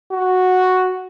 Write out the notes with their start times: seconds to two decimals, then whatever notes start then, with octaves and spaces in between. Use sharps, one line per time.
0.12 F#4